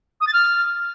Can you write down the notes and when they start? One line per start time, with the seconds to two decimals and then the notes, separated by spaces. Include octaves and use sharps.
0.21 D#6
0.27 A6
0.33 F6